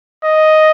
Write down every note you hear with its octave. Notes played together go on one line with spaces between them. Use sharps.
D#5